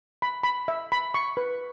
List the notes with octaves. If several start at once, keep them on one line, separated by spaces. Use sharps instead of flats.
B5
B5
E5
B5
C#6
B4